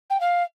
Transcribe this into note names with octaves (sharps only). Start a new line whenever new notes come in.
G5
F5